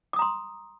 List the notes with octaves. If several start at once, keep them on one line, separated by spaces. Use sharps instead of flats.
A#5 C6 D6 D#6